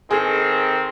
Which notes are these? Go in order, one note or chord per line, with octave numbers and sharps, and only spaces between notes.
D#3 C4 G#4 A4